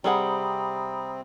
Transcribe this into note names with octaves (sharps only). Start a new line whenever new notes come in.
C3 G3 C4 G#4 F#5 A#5 B5 D#6